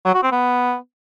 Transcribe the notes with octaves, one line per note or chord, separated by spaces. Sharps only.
F#3
F#4
C4
B3